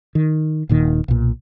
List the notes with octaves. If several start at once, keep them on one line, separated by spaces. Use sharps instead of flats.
D#3
D#1 A#2 D#3
B1 A#2